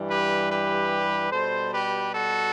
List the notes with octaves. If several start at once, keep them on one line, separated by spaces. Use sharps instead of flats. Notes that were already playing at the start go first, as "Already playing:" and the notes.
Already playing: G2 E3 G3
G4 B4
G4 B4
B2 G3 A4 C5
G4 B4
F#4 A4